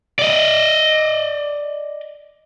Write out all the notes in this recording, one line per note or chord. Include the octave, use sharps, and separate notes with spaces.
D5 D#5